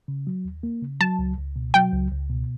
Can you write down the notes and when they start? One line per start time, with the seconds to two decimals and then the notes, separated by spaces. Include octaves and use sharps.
0.08 C#3
0.27 F#3
0.45 D#2
0.63 A#3
0.82 C#3
1.00 F#3 A5
1.19 C#2
1.38 C#2
1.56 B2
1.74 F#3 G5
1.93 C#2
2.11 C#2
2.30 B2